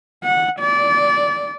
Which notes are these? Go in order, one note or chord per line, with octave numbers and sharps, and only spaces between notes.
F#5
D5